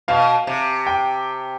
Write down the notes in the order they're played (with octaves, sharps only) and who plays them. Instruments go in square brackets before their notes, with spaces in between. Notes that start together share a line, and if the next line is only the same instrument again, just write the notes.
[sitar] B2 [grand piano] F5
[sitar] C3
[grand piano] G5